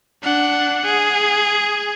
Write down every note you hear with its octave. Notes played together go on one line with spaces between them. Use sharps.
D4 F#5
G#4